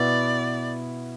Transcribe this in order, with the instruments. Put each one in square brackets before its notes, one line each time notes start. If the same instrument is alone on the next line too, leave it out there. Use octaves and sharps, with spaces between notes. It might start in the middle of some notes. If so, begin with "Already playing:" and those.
Already playing: [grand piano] B2 B3 E4 [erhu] D5